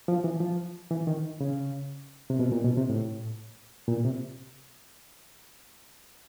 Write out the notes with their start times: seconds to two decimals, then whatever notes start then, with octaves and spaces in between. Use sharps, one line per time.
0.08 F3
0.24 E3
0.41 F3
0.91 E3
1.07 D#3
1.41 C#3
2.30 C3
2.39 B2
2.52 A#2
2.65 B2
2.77 C3
2.90 A2
3.88 A#2
4.05 C3